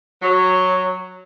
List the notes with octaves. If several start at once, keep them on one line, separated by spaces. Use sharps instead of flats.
F#3